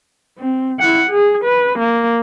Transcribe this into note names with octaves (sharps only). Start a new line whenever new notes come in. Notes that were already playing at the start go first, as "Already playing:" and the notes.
C4
E4 F#5
G#4
B4
A#3